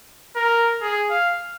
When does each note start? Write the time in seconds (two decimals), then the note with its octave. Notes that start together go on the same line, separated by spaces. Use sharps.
0.36 A#4
0.81 G#4
1.10 F5